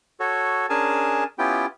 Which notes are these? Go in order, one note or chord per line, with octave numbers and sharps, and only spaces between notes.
F#4 A4 C#5
C#4 D4 G#4 A#4 G#5 A5
B3 C#4 E4 F4 G4 G5